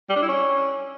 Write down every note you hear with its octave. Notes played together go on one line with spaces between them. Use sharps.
G3
D4
E4
C#4